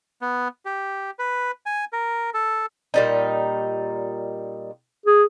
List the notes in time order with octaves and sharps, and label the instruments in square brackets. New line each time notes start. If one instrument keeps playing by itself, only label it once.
[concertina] B3
G4
B4
G#5
A#4
A4
[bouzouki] A#2 G3 D#4
[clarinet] G#4